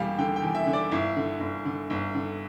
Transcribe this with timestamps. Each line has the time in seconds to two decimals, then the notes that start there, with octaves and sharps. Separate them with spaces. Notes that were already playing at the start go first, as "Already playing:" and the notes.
Already playing: E1 E2 G3 F5
0.18 D3 G5
0.36 G5
0.42 E2
0.55 E5
0.66 D3
0.73 D5
0.91 G1 E4
1.16 D3
1.40 G1
1.65 D3
1.90 G1
2.15 D3